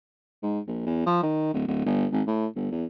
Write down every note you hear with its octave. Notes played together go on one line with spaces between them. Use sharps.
G#2
A#1
E2
F3
D#3
D1
D1
G1
G#1
A2
G1
E2